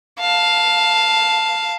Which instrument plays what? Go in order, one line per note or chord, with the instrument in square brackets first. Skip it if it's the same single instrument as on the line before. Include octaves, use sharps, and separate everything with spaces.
[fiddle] F5 A5